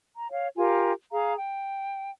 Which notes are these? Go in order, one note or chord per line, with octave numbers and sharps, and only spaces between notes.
A#5
C#5 F5
F4 G4 A#4 G#5
G#4 F5 A#5
G5